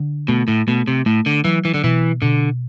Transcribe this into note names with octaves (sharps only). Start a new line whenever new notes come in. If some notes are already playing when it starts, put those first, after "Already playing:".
Already playing: D3
B2 A3
A2
B2 A3
C3
A2 A3
D3
E3 F#3
E3
D3
B2 E3
B2 D3